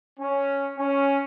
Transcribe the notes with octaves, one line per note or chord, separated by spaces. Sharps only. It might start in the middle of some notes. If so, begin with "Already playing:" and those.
C#4
C#4